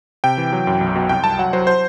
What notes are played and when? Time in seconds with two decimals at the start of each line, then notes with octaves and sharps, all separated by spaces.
0.24 C3 G5
0.38 E3
0.53 F#3
0.67 F#2
0.81 B1
0.96 B2
1.09 C2 G5
1.24 C2 A5
1.39 F#3 F#5
1.53 F#3 C5
1.67 C5